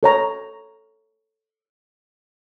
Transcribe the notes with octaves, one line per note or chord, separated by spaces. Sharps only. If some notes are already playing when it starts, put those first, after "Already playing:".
A4 C#5 A#5